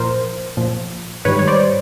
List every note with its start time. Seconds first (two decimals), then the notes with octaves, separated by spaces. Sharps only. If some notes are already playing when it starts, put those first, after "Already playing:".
Already playing: A#2 F3 A#4 C5
0.57 A#2 F3
1.25 G#2 D#3 G3 B4 C#5
1.39 C#5
1.47 C5 D5